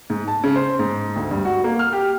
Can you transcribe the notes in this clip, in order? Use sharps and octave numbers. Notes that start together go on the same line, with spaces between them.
G#2
A5
C#3
C5
G#2
D2
G2
F#4
A#3
F6
G4